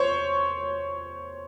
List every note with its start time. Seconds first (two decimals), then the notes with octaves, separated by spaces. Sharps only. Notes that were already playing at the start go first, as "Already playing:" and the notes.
Already playing: C5 C#5